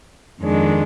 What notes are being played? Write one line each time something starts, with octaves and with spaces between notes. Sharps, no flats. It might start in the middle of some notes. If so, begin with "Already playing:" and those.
F2 D#3 G#3 D4